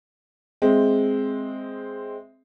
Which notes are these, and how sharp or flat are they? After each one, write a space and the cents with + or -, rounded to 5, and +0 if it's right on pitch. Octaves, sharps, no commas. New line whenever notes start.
G#3 +0 C4 +0 E5 +0